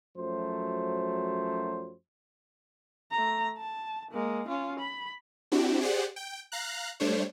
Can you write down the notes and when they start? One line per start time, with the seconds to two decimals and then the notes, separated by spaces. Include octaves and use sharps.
0.17 F#2 F3 F#3 A3 C5
3.11 A3 A#5
3.58 A5
4.11 G#3 A#3
4.48 C#4 F4
4.80 B5
5.52 C4 D4 E4 F#4 G4
5.81 G4 G#4 C5 D5 F#5
6.16 G5
6.52 F5 A#5 F#6
7.00 G3 A3 D4 C5 C#5